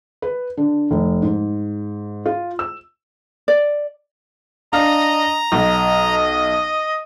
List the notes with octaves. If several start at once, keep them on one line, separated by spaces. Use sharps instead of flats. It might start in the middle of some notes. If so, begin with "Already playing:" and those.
B4
D3
F1
G#2
F4
E6
D5
D4 D#5 F5 A#5 F6
B1 D#5